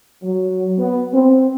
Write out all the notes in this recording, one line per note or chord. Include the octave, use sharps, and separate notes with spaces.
F#3
B3
C4